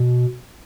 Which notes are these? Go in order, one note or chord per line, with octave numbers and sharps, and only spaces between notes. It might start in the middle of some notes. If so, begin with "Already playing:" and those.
Already playing: B2